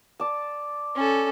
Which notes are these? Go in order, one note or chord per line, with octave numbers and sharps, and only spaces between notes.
D5 A5
C#4 A4